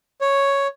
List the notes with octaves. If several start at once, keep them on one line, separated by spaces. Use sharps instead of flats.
C#5